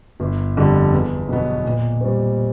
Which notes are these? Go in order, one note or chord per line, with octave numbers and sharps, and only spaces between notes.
G1
F2 D3 G3
E2
B2 F#3 B3
A#2
G3 C4